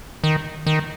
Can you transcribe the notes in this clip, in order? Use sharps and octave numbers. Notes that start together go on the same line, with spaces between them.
D#3
D#3